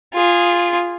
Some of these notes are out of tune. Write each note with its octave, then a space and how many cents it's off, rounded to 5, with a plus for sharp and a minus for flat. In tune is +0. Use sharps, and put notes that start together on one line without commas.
F4 +0 G#4 -15